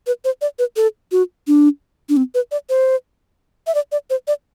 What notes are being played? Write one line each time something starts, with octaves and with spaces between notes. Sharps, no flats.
B4
C5
D5
B4
A4
F#4
D4
D4
C4
B4
D5
C5
E5
D5
D5
C5
D5